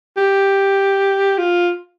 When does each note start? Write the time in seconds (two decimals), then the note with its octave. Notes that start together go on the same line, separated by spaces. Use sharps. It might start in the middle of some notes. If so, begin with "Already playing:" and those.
0.17 G4
1.38 F4